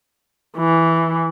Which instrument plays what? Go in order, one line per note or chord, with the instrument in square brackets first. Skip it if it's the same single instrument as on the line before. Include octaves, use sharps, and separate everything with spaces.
[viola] E3